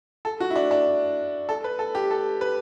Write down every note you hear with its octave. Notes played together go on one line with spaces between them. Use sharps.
A4
F#4
E4
D4
D4
A4
B4
A4
G4
A4
B4